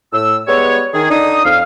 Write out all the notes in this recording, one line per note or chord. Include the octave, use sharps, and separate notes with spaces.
A2 E6
G3 G#3 B3 C#5
D#3 G#4
D3 D4 D#4 D#6
F2 F5